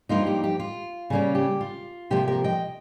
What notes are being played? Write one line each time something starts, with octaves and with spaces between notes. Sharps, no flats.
G2 F3 A#3 D#4 F4
G4
G4
F4
C#3 G3 A#3 C#4
G4
F4
C3 F3 A#3 G4
G4 A#4
D#5 G5